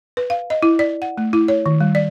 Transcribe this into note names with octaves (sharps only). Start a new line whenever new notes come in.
B4
F5
D#5
E4
D5
F#5
A3
E4
C#5
D#3
G3
D5